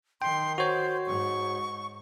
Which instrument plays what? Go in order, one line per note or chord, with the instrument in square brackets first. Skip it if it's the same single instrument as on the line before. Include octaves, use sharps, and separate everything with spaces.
[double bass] D#3 [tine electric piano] G5 [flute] C6
[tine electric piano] F#4 C#5 [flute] C5
[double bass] G#2 [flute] C#6